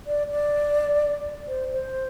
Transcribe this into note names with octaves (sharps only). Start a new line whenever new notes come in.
D5
D5
C5
C5